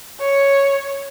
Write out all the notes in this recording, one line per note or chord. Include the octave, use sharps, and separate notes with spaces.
C#5